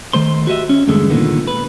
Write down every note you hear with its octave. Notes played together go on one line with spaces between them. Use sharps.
D#3 A3 C5 C6
F#4 G4 D#5 E5
C#4
E2 G2 D3 G#3 A3
C2 A#2 D3 D#3 A#3 B3
B4